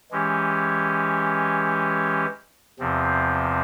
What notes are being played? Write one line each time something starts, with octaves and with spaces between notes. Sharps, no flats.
E3 G#3 C#4 G4
E2 C3 F3 C4